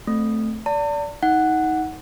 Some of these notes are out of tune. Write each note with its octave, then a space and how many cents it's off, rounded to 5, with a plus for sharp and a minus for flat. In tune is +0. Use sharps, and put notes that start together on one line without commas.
A3 +0 C4 +0
D5 -20 A5 +45
D#4 +25 F#5 +0